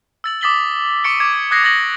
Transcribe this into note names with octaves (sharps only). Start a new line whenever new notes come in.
E6 A6 F#7
D6 D#6 A6 B6 F#7 G7
C#6 D6 A6 C#7 D7 G7
D6 G#6
D#6 F#6 G#6 A#6 C7
D6 A6 A#6 F#7 G7